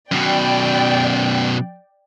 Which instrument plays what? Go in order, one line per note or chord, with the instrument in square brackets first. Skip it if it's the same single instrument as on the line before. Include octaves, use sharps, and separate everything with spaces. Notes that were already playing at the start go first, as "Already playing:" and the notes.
[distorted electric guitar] F#2 B2 [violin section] D5 G5